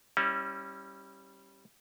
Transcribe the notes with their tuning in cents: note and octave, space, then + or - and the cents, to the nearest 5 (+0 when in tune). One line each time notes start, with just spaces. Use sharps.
G3 +0 C#4 -25 E4 -30